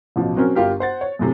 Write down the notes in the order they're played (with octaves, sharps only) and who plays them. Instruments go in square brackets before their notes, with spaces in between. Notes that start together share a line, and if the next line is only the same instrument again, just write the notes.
[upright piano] A1 B2 F3
F#3 C4 C#4 A#4
G1 F4 G4 A#4
C5 F#5 A6
C#5
F#2 A2 C3